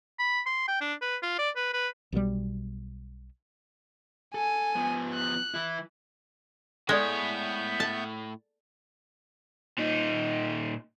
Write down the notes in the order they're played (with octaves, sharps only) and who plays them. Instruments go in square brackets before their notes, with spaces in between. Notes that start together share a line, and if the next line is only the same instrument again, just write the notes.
[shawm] B5
C6
G5
D4
B4
F4
D5
B4
B4
[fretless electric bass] B1 B2 D3 G3
[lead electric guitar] A4 [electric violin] G#5
[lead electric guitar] F3 B3
[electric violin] F#6
[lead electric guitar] E3 E4
[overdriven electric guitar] A2 C#5 [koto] G#3 [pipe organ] B3 E5 G6 [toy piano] A4 D5
[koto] A5
[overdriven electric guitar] A#2 D#4